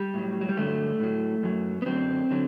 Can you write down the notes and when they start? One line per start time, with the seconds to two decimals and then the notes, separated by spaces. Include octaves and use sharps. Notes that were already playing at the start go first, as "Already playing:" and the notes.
Already playing: G3
0.14 A2 F#3
0.41 F#3
0.49 G3
0.57 G2 D3 F#3 A3
1.00 A2 F#3
1.43 F#2 F#3
1.82 B3
1.86 F#2 D3 F#3 C4
2.31 D3 F#3